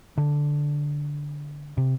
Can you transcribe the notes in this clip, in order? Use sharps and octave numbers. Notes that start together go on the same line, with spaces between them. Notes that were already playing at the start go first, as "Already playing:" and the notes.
D3
C3